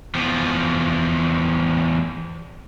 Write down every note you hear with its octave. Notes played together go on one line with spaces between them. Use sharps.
E2 F3